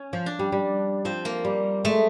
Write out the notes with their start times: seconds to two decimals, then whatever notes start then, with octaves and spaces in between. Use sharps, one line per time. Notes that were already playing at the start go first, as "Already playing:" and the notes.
Already playing: C#4
0.13 F3
0.26 D4
0.39 G3
0.52 G3
1.05 F3 C4
1.25 A#3
1.45 G3
1.85 G#3 A3